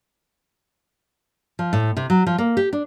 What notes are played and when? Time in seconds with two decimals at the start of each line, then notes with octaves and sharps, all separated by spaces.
1.59 F3
1.73 A2
1.97 C3
2.10 F#3
2.27 F3
2.38 A#3
2.57 G4
2.73 D4